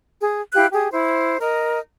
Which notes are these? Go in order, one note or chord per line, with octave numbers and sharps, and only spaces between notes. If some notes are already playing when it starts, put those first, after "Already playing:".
G#4
E4 G4 F5 F#6
G4 G#4
E4 C5
A#4 D#5